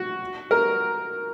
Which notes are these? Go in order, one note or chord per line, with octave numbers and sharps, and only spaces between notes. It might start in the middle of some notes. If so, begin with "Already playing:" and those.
Already playing: F#4
A#4